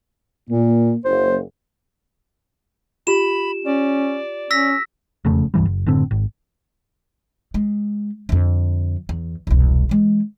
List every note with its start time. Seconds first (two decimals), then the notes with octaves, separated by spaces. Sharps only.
0.50 A#2 A#3
1.05 F#1 C5
3.07 F4 G4 B5 E7
3.65 C#4 D5
4.51 C#4 E6 A#6 B6
5.25 E1 F2 C#3 A3
5.54 C#2 G2 E3 G3
5.65 F#1
5.86 F#1 A2 D3 C4
6.11 G#1
7.54 G#3
8.29 F2 D3
9.09 E2
9.47 E1 C2
9.89 E3 G#3